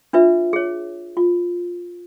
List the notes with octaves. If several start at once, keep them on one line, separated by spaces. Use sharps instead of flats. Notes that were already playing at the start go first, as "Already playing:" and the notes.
D4 F4 B4 E5
G#4 C#5
F4